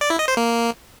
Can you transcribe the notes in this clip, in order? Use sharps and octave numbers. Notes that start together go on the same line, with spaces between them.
D5
E4
D#5
C5
A#3